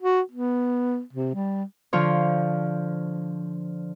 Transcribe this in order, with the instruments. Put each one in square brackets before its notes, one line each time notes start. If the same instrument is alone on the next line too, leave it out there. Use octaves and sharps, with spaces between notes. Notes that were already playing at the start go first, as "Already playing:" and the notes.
[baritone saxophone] F#4
B3
C3
G3
[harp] D3 F3 F4 C5 C#5